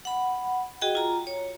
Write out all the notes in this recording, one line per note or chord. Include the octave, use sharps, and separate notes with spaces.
F#5 B5
F#4 G#4 D#5 G5
F4 A#5
C#5